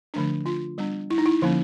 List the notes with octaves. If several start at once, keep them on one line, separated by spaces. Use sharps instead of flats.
D3 F3 A3 D4
F4
G3 B3 D4
E4
D#4
E4
D3 F3 A#3 C#4